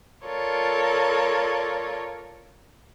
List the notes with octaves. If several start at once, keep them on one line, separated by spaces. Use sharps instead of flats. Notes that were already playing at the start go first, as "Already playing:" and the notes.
F4 A4 A#4 C#5 D5